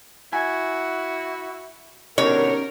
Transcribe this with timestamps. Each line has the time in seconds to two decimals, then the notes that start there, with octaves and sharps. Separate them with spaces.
0.33 E4 F#4 G#5
2.18 B2 D3 C#4 D#4 G4 A#4 C#5